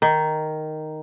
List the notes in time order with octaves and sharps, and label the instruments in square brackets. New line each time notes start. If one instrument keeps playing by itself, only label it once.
[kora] D#3